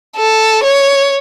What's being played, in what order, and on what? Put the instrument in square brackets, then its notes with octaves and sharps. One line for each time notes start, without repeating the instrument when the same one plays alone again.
[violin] A4
C#5